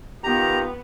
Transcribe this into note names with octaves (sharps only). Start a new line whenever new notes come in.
D#3 B3 F4 G4 A#5